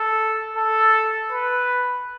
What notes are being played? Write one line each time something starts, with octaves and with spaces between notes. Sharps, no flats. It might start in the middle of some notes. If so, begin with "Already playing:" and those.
Already playing: A4
A4
B4